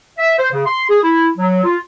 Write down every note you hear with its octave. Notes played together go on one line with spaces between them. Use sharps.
E5
C5
C#3
C6
G#4
E4
F#3
F4